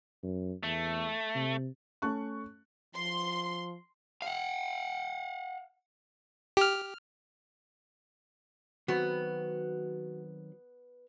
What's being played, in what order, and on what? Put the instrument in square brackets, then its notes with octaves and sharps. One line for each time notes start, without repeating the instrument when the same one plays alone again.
[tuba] F#2
[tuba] E2 [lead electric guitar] A3
[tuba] C3
[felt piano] A3 C#4 A5 C#6 F#6
[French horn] F3 [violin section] C6
[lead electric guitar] F5 F#5
[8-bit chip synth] G4 F6
[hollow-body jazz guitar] D#3 F#3 C4 [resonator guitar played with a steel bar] B3 [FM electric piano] F#4